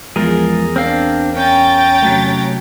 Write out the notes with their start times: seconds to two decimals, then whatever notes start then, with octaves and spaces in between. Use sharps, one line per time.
0.16 E2 F3 G#3 G#4 A#4
0.76 C4 D4 A#4 F5
1.37 C#4 G5 A#5 A6
2.02 C3 F#3 A3